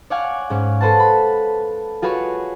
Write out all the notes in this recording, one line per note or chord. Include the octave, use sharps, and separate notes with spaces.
C#5 D5 F5 F#5 G#5
G#2 C#4
A4 B4 C5 F#5 A5
B5
F4 F#4 G#4 B4 C#5